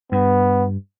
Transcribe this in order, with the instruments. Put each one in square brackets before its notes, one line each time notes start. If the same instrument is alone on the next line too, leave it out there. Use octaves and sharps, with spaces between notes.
[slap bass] G2 [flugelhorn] B3